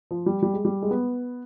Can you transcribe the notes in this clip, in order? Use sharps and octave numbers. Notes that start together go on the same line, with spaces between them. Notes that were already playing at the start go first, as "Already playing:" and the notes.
F3
G3
G3
G#3
G3
G#3
B3